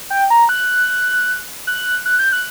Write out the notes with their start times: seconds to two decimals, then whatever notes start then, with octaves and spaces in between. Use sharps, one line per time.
0.10 G5
0.30 A#5
0.49 F#6
1.67 F#6
2.06 F#6
2.19 G6
2.32 F#6